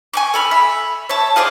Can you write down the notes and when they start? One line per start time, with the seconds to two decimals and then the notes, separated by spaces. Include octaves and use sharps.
0.13 G#5 C#6 D6
0.34 A4 B5 F6
0.51 E5
1.09 C#5 E5 A5
1.36 F4 G#4 C5 D5